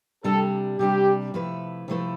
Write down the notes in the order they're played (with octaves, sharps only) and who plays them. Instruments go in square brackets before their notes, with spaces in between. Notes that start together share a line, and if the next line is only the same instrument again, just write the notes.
[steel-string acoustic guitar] C3 G3 D4 [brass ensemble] A4
[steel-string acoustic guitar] C3 G3 D4 [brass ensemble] G4
[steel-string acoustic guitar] C3 F3 A3 E4 B4
C3 F3 A3 E4 B4